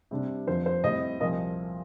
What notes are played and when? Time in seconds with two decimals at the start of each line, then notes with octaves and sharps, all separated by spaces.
0.11 C3 G3 D4
0.47 F2 D3 F3 C5
0.66 C5
0.84 A2 G3 C4 D#5
1.20 C2 A#2 F3 D#5